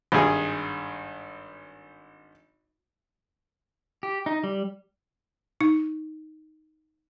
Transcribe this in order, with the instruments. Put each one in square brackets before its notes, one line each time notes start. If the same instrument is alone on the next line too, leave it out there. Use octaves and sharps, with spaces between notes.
[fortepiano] G#1 G2 G#4
[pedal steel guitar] G4
D#4
G3
[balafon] D#4